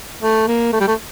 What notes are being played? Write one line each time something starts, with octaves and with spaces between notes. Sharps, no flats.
A3
A#3
A3
G3
A3